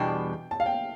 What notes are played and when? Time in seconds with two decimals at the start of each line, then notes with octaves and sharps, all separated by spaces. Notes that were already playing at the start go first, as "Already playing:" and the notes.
Already playing: E2 B2 G3 D4 G5
0.51 A5
0.60 F5
0.66 G5